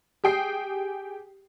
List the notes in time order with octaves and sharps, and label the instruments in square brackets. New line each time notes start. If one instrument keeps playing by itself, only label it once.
[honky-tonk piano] G4 G#4 G5 D#6 C7